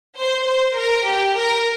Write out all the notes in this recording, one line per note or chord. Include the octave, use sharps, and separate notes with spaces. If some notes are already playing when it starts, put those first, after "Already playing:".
C5
C5
A#4
G4
A#4